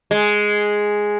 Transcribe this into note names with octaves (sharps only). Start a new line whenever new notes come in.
G#3